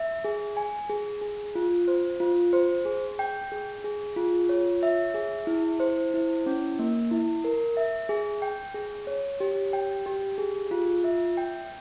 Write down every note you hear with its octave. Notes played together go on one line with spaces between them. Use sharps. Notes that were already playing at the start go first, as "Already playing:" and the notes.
Already playing: E5
G#4
G#5
G#4
G#4
F4
C5
F4
C5
G#4
G5
G#4
G#4
F4
C#5
E5
G#4
E4
C5
E4
C#4
A#3
E4
A#4
E5
G#4
G5
G#4
C#5
G4
G5
G4
G#4
F4
E5
G5